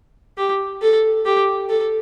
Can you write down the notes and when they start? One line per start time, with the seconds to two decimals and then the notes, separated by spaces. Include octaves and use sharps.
0.37 G4
0.82 A4
1.26 G4
1.69 A4